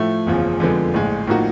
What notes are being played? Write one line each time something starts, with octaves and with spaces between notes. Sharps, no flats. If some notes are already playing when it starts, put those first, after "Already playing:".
Already playing: A2 F3 A3
F#1 E2 C#3 F3
F2 D3 F3 G#3 B3
A#1 A2 F3 G#3
A2 F3 A#3 D#4 F#4